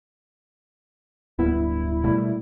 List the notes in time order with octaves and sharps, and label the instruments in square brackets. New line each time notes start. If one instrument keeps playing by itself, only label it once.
[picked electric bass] D1 G2 B3 [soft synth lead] E4
[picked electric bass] B2 G3 A3